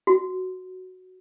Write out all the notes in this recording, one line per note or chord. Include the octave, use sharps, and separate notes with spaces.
F#4